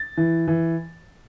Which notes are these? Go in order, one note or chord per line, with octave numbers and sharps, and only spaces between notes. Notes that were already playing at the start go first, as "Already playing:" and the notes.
Already playing: A6
E3
E3